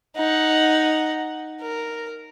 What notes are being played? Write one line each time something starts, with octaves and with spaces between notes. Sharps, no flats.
D#4 F#5
A#4